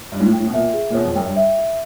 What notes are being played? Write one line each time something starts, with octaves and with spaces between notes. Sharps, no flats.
G2 C#5
G#2
A2
G5
A2
B2
A#2 E5
G#4
A#2
B2 C#5
F2
F#2 G5
G2
E5